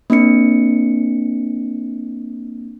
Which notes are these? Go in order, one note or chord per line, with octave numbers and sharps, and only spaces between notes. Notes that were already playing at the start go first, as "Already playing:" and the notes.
A#3 C4 D4 C#7